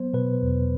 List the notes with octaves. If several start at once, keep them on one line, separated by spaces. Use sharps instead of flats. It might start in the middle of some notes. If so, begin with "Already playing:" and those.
Already playing: F#3 B3 C5
B2 B4
E2